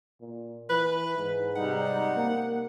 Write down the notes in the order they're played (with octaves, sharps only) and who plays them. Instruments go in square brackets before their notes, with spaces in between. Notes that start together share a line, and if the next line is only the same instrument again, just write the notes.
[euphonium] A#2
[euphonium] E3 [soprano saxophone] B4
[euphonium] G#2
[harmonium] C3 G3 D#4 [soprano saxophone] F#5
[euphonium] A#3